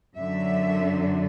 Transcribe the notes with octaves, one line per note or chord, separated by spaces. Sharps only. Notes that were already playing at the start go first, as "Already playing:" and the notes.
F#2 D3 F#3 E5